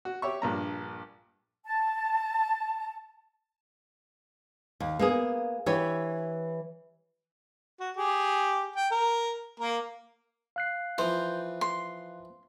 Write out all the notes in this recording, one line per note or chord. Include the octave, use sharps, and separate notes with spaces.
F#4
G4 C#5 E5 C#6
A#1 G2 A#5
A5
D#2
A#3 B3 G#4
E3 G4 C#5
F#4
G4 G#4
G5
A#4
A#3 A#4
F5 F#6 C7
E3 F3 C5
C6